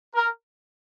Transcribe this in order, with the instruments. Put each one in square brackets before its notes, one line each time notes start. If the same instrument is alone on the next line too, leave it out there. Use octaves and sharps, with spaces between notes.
[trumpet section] A#4